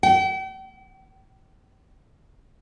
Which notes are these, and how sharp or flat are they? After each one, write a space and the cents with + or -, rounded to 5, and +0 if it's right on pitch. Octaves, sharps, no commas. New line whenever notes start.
G5 -40